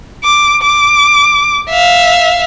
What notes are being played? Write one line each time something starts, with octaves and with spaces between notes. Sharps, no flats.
D6
D6
E5 F5